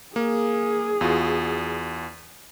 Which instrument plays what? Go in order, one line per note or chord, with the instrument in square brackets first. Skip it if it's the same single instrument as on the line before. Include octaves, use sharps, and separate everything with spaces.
[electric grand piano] A#3 [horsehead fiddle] G#4
[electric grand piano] E2 F4 F#4